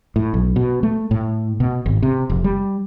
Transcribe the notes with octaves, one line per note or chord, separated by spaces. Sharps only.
A2
B1
B2
A3
A2
B2
G#1
C3
F1
G3